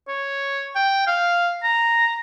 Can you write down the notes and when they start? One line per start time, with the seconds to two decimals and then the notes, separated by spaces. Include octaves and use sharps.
0.08 C#5
0.76 G5
1.07 F5
1.63 A#5